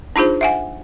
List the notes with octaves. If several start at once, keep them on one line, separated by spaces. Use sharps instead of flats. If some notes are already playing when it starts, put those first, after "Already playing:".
D4 D#4 F4 G#4 C5
E5 F#5 G#5